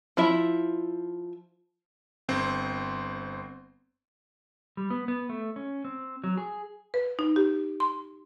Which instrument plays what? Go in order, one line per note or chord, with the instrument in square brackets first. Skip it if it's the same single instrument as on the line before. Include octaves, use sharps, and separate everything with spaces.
[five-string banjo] F3 E4 E5
[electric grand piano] G1 C4 C5
[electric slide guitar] G3
B3
B3
A3
C#4
C4
F#3
G#4
[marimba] B4
D#4
G4
C6